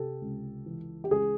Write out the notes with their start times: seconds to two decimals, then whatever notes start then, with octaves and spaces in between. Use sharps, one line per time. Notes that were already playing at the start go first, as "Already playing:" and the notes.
Already playing: C3 G4 A4
0.21 C#2
0.66 E3
1.04 G4
1.10 C#2 G#4